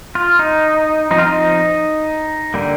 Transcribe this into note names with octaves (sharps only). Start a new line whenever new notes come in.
F4
D#4
F3 C4 D#4
F4
D#4
D3 G3 A#3